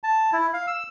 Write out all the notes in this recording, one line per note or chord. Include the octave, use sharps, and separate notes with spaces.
A5
E4
F5
E6